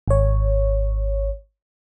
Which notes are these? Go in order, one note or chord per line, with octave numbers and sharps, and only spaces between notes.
G#1 C#5